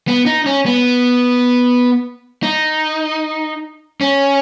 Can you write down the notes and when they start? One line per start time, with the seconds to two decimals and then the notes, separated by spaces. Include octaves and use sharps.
0.08 B3
0.26 D#4
0.46 C#4
0.66 B3
2.43 D#4
4.01 C#4